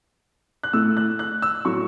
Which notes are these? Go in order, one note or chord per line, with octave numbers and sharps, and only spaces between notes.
F#6
A2 A3 E6
F#6
F#6
E6
A2 F#3 A3 C#6